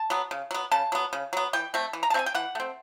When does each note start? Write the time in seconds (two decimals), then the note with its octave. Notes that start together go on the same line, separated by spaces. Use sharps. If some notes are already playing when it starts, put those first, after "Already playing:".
Already playing: A5
0.10 F#3 B3
0.31 C#3
0.51 F#3 B3
0.71 C#3 A5
0.92 F#3 B3
1.13 C#3
1.33 F#3 B3
1.53 E3 G5
1.74 A3 C4
1.93 E3
2.03 A#5
2.10 A5
2.14 A3 C4
2.19 G#5
2.26 G5
2.35 E3 F#5
2.55 A3 C4